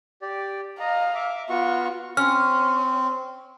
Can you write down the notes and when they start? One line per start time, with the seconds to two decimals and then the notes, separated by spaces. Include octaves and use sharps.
0.22 G4 D5
0.80 D#5 F5 A#5
1.15 E5 D6
1.49 B3 F4 F#4 C#6
2.17 C4 C#4 F6